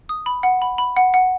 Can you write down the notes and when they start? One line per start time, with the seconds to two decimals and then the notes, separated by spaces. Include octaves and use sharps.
0.09 D#6
0.26 B5
0.43 F#5
0.62 B5
0.78 B5
0.97 F#5
1.14 F#5